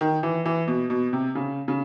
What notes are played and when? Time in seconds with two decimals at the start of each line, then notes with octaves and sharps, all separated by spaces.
0.01 D#3
0.23 E3
0.46 E3
0.68 B2
0.90 B2
1.13 C3
1.35 C#3
1.68 C#3